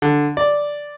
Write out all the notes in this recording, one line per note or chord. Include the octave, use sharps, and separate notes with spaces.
D3
D5